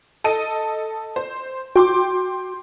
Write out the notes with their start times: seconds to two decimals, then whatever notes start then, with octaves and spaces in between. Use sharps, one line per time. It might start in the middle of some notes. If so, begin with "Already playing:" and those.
0.24 A4 D#5 D#7
1.16 C5
1.76 F#4 G5 C6 D6